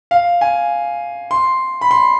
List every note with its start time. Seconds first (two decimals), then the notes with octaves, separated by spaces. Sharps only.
0.11 F5
0.41 G#5
1.31 C6
1.81 B5
1.91 C6